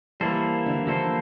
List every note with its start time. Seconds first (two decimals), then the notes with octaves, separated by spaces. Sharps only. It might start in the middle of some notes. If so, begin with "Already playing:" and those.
0.20 E3 G3 A#3 E4 A4 C5
0.66 D3
0.77 E3
0.87 D3 F3 A#3 E4 A4 C5